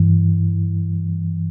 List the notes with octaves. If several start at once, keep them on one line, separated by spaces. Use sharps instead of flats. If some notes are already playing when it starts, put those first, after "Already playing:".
Already playing: G2 E3